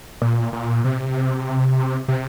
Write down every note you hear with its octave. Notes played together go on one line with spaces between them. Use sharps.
A#2
A#2
C3
C3